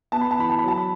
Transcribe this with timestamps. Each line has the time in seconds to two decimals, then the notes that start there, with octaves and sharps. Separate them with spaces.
0.12 B3 A5
0.21 B5
0.31 A5
0.38 E3 B5
0.50 A5
0.59 B5
0.63 F#3 A5
0.78 B5